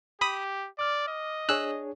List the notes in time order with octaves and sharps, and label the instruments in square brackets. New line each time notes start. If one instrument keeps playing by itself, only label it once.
[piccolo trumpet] G4 [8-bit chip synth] B5 D#6
[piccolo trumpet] D5 [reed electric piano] D6 F6
[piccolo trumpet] D#5
[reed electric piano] D4 G#4 C#5 [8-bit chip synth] E6 F#6